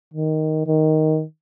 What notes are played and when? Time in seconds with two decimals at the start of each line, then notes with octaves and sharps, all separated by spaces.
0.14 D#3
0.67 D#3